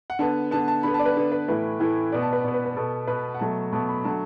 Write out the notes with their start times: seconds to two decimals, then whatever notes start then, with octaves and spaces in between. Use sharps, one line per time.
0.10 F#5
0.19 D3 B3 A5
0.51 D3 B3 A5
0.68 A5
0.83 D3 B3 B5
0.94 A5
0.99 D5
1.06 B4
1.16 D3 B3
1.32 B4
1.48 A2 E3 A3 B4
1.80 A2 E3 A3
2.12 B2 B3 D5
2.22 A5
2.33 B4
2.44 B2 B3 D5
2.54 B4
2.65 B4
2.76 B2 B3 A4
3.07 B2 B3 B4
3.34 F#5
3.40 B2 F#3 A3 A5
3.73 B2 F#3 A3 A5
3.89 B5
4.04 D3 F#3 A3 A5